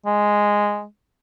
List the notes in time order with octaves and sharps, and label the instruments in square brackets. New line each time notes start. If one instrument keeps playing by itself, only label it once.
[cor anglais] G#3